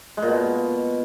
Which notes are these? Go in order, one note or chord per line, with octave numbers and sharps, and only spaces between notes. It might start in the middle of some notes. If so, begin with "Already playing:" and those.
G#3
A#2
B2